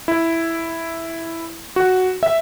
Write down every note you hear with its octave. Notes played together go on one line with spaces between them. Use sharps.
E4
F#4
E5